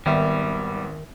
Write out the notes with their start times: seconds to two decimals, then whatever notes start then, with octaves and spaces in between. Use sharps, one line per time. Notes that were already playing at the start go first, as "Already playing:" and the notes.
0.06 G#1 D#3 G3 B3 E5